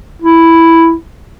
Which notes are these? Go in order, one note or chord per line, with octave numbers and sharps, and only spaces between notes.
E4